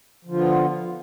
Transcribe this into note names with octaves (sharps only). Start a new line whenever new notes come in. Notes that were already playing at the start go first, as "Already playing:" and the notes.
D3 F3 B3 F4